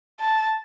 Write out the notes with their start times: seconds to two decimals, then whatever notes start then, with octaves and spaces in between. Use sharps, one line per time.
0.21 A5